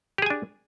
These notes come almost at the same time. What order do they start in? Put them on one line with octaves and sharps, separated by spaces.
G4 G#4 G#5 D4